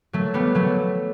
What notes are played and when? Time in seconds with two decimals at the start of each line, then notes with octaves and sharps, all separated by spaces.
0.13 F#3 A3
0.34 G3 B3
0.55 F#3 A3